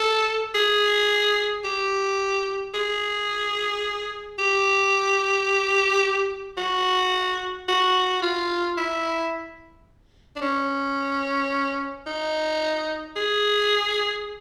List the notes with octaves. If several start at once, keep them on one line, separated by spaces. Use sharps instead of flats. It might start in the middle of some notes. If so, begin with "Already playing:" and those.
Already playing: A4
G#4
G4
G#4
G4
F#4
F#4
F4
E4
D4
C#4
D#4
G#4